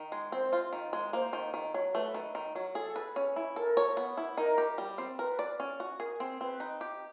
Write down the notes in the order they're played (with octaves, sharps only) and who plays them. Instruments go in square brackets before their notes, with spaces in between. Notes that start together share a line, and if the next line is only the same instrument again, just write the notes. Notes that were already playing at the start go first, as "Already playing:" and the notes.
Already playing: [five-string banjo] D#3
G#3
[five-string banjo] C4 [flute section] C5
[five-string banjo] F4
D#3
G#3
[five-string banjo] A#3 [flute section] C5
[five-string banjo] D#3
D#3
F#3
[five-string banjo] A3 [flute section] B4
[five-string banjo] D#3
D#3
F#3
[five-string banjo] G#4 [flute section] A4
[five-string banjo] B4
C#4
E4
[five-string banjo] A4 [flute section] A#4
[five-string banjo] C#5
B3
E4
[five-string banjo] D#4 [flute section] A#4
[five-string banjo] G4
G3
C4
[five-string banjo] A#4 [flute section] B4
[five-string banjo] D5
C#4
F#4
[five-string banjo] G#4 [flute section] A#4
[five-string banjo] C4
[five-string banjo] C4 [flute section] B4
[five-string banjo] D#4
G4